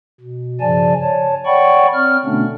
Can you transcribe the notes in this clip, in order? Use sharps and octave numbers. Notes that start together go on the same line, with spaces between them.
B2
G2 C#3 F3 D5 G#5 A5
C#5 A5
C#5 D5 F#5 G5 B5 C#6
C4 F6
B2 D3 A3 B3 C#4 D4